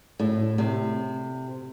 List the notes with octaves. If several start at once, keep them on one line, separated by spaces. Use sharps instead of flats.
A2
C3